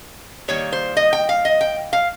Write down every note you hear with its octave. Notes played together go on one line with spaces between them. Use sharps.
D#3 G3 A#3 C#5
C5
D#5
G5
F5
D#5
G5
F5